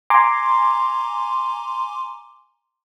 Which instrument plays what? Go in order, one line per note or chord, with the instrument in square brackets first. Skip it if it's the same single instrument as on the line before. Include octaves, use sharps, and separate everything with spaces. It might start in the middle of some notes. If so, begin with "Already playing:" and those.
[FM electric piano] G#5 A#5 C6 D6